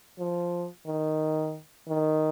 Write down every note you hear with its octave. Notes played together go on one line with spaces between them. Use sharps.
F3
D#3
D#3